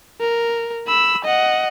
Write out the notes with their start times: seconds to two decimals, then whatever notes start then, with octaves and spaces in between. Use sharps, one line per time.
0.21 A#4
0.88 B5 E6
1.24 D#5 F#5